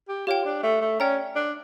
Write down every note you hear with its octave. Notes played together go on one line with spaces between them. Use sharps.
G4
F4 G4 C#5 G5
D4
A3
A3
C#4 D5 G5 A#5
D4